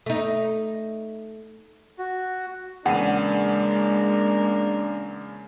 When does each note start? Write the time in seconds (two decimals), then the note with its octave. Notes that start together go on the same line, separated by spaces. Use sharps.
0.06 A3 D#4
1.99 F#4
2.86 E2 C#3 G#3 A#3 D4 G#4 F#5 D#7